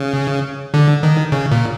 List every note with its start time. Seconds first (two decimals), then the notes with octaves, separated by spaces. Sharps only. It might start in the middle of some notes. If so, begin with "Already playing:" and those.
Already playing: C#3
0.74 D3
1.03 D#3
1.32 C#3
1.52 A#2